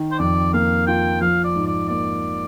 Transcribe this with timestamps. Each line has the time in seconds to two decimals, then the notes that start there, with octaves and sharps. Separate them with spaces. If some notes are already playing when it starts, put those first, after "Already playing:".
Already playing: D#3
0.11 C5
0.19 F2 D5
0.53 A#3 F5
0.87 F4 G5
1.21 F3 F5
1.44 D5
1.55 G#2
1.67 D5
1.89 A#3 D5